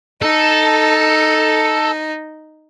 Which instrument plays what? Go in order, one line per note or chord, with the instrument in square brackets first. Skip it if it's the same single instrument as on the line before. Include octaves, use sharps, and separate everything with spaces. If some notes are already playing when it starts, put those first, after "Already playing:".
[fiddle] D#4 [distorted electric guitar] A4